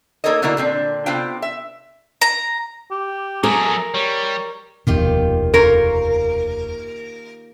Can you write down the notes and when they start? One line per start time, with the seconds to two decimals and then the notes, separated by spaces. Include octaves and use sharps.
0.24 A#3 D#4 A4 A#4 C#5 D#5
0.42 B2 D3 A3 A#3 E4 A#4
0.57 A#2 D3 C4 D4
1.06 C3 B3 F4 C5 F5 G5
1.42 E5
2.21 A#5
2.91 G4
3.44 F#3 A3 G#4 A#4
3.94 G3 C#5
4.87 F1 D#2 B2 D#3 F4 G4
5.54 A#3 A#4 C5 C#5